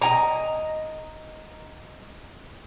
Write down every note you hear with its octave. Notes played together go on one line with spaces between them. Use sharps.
D#5 G#5 A#5